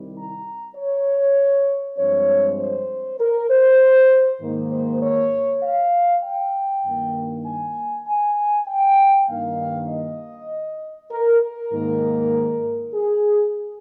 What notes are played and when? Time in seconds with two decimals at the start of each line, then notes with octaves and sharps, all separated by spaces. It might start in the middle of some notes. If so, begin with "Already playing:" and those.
Already playing: C2 C3 D#3 G3
0.16 A#5
0.76 C#5
1.98 G2 F3 G#3 C4 C#5
2.60 C5
3.20 A#4
3.50 C5
4.41 G#2 D#3 A#3
4.72 C5
5.02 C#5
5.63 F5
6.24 G5
6.85 G2 D#3 A#3
7.46 G#5
8.07 G#5
8.68 G5
9.28 G2 D#3 A#3 F5
9.89 D#5
11.11 A#4
11.42 A#4
11.72 G#2 D#3 A#3
12.94 G#4